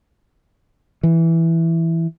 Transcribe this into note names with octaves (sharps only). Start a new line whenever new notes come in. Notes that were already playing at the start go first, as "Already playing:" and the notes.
E3